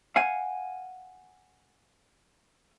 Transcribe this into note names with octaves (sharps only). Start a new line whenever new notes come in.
F5 F#5 G#5